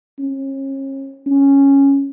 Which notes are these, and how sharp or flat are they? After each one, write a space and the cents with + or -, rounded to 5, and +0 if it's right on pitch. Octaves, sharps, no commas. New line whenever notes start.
C#4 -35
C#4 -5